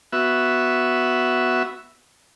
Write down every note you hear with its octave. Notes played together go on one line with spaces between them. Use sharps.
B3 F#4 E5